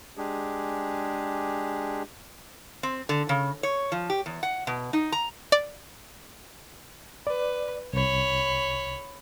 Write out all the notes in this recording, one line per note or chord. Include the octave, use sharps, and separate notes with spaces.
G#3 D4 G4 G#4
C4
D3
C#3
C#5
F3
G4
E2
F#5
B2
D#4
A#5
D5
B4 D5
C2 C#5 B5